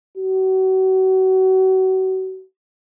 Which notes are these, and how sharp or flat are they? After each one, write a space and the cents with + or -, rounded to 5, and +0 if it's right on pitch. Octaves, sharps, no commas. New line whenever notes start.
F#4 +35